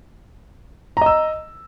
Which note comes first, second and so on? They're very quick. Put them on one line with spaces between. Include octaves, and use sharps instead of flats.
A#5 D#5 E6